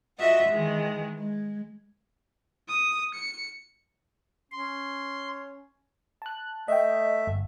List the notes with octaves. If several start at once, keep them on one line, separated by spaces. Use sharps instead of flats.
F4 F#4 D#5 E5 F#5
D#3 E3 G#3
G#3
D#6
C#7
C#4 C6
A5 F#6
A3 D#5 E5 G5
G1